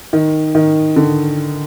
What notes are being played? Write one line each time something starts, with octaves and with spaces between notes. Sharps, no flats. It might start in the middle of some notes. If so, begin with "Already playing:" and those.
D#3
D#3
D3